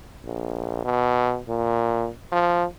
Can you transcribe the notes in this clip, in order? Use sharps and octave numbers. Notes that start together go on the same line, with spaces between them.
A#1
B2
A#2
F3